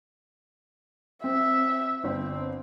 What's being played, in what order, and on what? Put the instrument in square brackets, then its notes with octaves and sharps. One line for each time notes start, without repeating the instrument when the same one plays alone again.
[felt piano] C4 [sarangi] E5
[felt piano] G1 [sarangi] C4